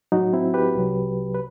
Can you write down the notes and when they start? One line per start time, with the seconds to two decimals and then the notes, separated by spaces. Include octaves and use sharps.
0.12 A2 F#3 D#4 F#4
0.33 C4 E4
0.54 G4 B4
0.75 C2 C3 F#3
1.34 B4